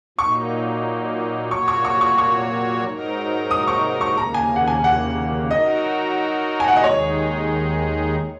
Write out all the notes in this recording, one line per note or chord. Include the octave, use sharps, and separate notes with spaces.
A#2 F#3 A#3 D#4 C#6
A#2 F#3 A#3 F#4 C#5 C#6
C#6
C#6
C#6
C#6
G#2 F#3 D#4 A#4
D#6
C#6
C#6
D#2 C#3 A#3 A#5
G#5
F#5
G#5
F#5
F#3 D#4 F#4 A#4 D#5
G#5
F#5
D#5
D#2 D#3 G#3 D#4 G#4 C#5